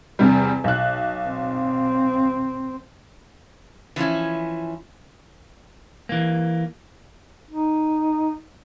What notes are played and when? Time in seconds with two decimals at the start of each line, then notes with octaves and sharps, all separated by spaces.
0.19 E2 C3 G3
0.64 B1 F#6
1.28 C4
3.96 E3 F3 C#4 E4
6.09 E3 A#3
7.51 D#4